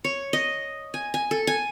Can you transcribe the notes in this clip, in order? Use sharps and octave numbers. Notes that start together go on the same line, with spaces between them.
C#5
D#5
G#5
G#5
A4
G#5